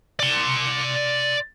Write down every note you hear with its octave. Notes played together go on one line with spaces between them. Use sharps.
D5 C6